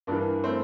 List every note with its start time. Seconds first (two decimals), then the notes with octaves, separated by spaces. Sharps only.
0.07 G2 E3 A#3 D4
0.44 A3 C4